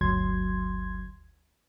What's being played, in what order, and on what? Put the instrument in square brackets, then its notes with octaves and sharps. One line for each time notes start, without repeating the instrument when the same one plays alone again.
[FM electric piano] G1 D2 F#3 C6 G#6